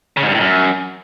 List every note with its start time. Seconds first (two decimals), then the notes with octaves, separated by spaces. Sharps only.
0.17 C#3
0.23 G#2
0.29 G2
0.34 A2
0.40 F#2